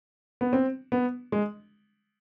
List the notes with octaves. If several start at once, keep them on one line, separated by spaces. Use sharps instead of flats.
B3
C4
B3
G#3